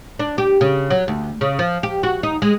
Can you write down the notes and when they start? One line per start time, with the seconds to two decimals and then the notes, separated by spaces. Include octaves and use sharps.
0.19 D4
0.38 G4
0.61 C#3
0.90 F#3
1.08 D2
1.41 C#3
1.59 F3
1.83 G4
2.03 F#4
2.23 D#4
2.42 G#3